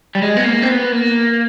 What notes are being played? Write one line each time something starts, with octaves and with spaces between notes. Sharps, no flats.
G3
G#3
B3
A#3
C4
B3
A#3